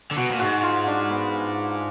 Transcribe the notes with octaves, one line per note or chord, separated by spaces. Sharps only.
D3
B2 F#4
A#2
G#2 F#4
F4
D4
B3